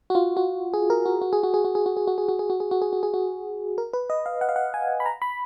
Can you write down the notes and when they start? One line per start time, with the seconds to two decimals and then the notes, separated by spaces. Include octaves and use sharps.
0.10 F#4
0.15 F4
0.37 F#4
0.74 G#4
0.90 A#4
1.06 F#4
1.21 F#4
1.33 G#4
1.43 F#4
1.54 G#4
1.65 F#4
1.75 G#4
1.86 F#4
1.97 G#4
2.07 F#4
2.18 G#4
2.29 F#4
2.39 G#4
2.50 F#4
2.60 G#4
2.71 F#4
2.82 G#4
2.93 F#4
3.03 G#4
3.14 F#4
3.78 A#4
3.93 B4
4.10 D#5
4.26 F5
4.41 F#5
4.49 F5
4.56 F#5
4.74 G#5
5.00 B5
5.06 A#5
5.22 B5